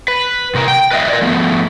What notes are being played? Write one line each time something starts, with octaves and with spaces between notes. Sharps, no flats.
B4
C3 A#4 A#5
G5
B4 D#5 E5
A#4 D5
F3 A3 B3